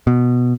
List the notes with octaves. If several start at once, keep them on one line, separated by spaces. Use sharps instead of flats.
B2